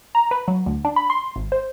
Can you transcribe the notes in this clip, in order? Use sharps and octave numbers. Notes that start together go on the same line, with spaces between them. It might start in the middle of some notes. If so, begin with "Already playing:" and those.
A#5
B4
F#3
D2
D4
B5
C6
G#1
C5